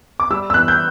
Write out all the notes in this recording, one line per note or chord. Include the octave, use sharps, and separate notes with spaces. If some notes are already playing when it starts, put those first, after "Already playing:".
D6
G3 E6
E6
E3 F#6
G6